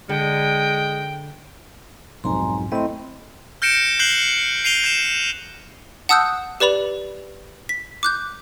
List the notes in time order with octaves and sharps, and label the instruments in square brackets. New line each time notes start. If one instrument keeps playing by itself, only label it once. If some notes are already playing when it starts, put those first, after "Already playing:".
[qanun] D3 B5 [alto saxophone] G#3 [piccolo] G5
[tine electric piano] B1 F2 G#2 [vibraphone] G#5 A#5 C6
[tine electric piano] A3 C4 E4 [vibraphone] D#5 C6
[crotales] F6 G6 A#6 C#7 D7 E7
F#6 G6 C7 F#7 G7
C7 D#7 F7 G7
G6 E7
[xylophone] F#5 A5 D#6 E6 F#6 G6
G4 B4 D5 B5 F7
B6
D6 F#6 G6